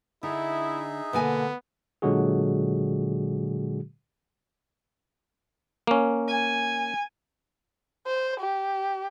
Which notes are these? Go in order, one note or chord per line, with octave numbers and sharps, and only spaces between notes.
D3 D#4 E4 G#4 E5
B2 D3 A#3 B3 G#5
A#2 D3 F#3 G#3 F#4 G#4
A#3 C#4
G#5
C5
G4